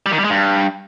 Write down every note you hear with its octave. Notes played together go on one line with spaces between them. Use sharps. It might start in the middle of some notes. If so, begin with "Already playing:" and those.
G3
D#3
G3
G#3
G2